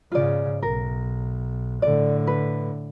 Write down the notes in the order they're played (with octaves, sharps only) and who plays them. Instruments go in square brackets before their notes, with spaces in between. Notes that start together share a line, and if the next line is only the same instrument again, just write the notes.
[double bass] G#2 C#3 [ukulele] F4 D5
[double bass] B1 [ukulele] A#4
[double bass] A2 D3 [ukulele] D5
[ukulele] B4